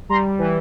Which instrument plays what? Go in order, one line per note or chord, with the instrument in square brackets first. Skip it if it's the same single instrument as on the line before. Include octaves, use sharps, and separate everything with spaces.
[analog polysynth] G3 A#5 C6
E3